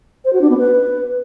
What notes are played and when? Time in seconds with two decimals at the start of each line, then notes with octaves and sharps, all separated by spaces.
0.25 C5
0.33 F#4
0.41 D4
0.50 B3
0.58 B4